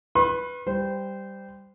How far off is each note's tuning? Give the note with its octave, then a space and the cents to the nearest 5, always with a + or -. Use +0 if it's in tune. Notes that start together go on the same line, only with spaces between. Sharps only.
B4 +0 C6 +40
G3 +0 C5 -20